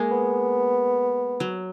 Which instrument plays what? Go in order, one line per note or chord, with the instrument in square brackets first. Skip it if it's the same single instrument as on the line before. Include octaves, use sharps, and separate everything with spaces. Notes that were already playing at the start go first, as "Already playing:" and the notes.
Already playing: [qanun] G#3 A#3
[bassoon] B3
[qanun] F#3